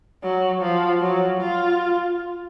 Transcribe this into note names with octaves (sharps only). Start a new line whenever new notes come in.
F#3
F3
F#3
F4